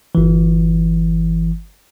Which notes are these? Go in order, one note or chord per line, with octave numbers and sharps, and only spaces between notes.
G1 E3